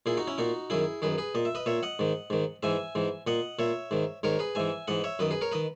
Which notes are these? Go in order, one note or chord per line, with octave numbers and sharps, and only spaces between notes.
A#2 E4 G#4
D#4 F#4
C#4 E4
A#2 D#4 F#4
F#2 D#3 E4 G#4
F#2 D#3 G#4 B4
G#4 B4
A#2 D#5
E5
B4 D#5
A#2 C#5 E5
D#5 F#5
G#2 D#3
G#2 D#3
G#2 E3 E5 G#5
G#2 E3
A#2 D#5 F#5
A#2 C#5 E5
G#2 D#3
G#2 D#3 A#4 C#5
G#4 B4
G#2 E3 E5 G#5
G#2 E3 D#5 F#5
C#5 E5
F#2 D#3 B4 D#5
G#4 B4
A#4 C#5
D#3 B4 D#5